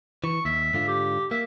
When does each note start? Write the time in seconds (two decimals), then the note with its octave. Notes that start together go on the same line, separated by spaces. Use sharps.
0.24 E3 C#6
0.45 D#2 E5
0.74 G#2 D3 F4
0.88 G4
1.31 A#3 E5